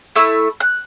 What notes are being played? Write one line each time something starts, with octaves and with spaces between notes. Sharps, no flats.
A3 E4 E6
F#6